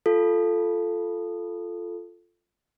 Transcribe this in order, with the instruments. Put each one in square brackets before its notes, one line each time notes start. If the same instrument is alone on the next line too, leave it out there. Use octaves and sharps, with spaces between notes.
[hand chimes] F4 A4